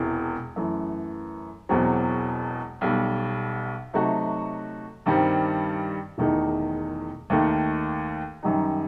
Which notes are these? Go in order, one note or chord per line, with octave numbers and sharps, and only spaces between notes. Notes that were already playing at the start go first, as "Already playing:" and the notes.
Already playing: E1 E2 C3 E3
F#2 E3 A3
E1 E2 B2 F#3 C4
B1 B2 G3
C3 F#3 A3 D#4 F#4
G2 D#3 G3 C4
E1 E2 D#3 A3 D#4
D#2 D#3 A3
F#2 D#3 G3 D#4